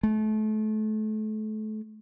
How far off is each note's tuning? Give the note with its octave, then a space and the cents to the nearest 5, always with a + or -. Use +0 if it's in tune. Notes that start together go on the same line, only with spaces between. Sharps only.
A3 -30